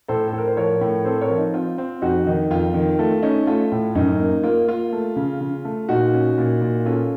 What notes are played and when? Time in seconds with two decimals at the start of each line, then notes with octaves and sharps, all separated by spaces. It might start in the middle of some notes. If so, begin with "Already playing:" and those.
0.08 A2 A4 C5
0.28 A4
0.33 A2
0.38 A#4
0.48 C5
0.56 F3 A#4 C#5
0.81 A2
1.05 C4 A4 C5
1.21 A#4 C#5
1.29 F3
1.38 D#4
1.54 C4 F4
1.78 C4
2.02 F2 D#4 F#4
2.26 D#3 D#4
2.50 F2 F4
2.74 D#3
2.99 A3 F4
3.22 C#4 D#4
3.47 A3 F4
3.72 A2
3.95 F#2 D#4
4.20 A#3
4.43 A#3 F4
4.68 A#3 F4
4.92 A3
5.16 C#3
5.41 C#3
5.65 A3
5.89 A#2 D#4 F#4
6.13 C#4
6.38 A#2
6.61 A#2
6.85 C#4 F4 A4